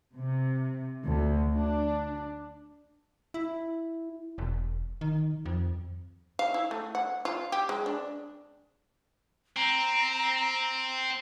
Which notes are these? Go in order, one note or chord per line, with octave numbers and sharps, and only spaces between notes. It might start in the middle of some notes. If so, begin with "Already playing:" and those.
C3
D2
D4
E4
E1
D#3
F2
F5
E4
A3
F#5
F4
G4
G#3
D4
C4 A#5